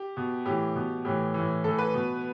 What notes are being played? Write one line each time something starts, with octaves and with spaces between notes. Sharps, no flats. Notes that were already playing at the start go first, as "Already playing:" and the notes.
Already playing: G4
B2
A2 E3 G4
B2
A2 E3 G4
A2 E3
A2 E3 A4
B4
B2